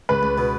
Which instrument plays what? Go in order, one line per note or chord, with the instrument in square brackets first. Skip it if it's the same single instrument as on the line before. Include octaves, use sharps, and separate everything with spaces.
[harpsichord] C#2 [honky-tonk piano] B4
[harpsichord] C#2
B2